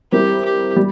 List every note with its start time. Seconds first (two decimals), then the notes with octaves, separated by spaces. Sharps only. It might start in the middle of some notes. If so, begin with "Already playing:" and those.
0.12 G3 C4 E4 G4 A#4
0.45 G4
0.76 G3